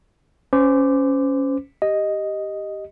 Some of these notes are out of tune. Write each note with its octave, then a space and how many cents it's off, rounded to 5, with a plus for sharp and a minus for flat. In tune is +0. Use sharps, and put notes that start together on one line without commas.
C#4 +0 C5 -30 D6 +0
G4 +0 D#5 +0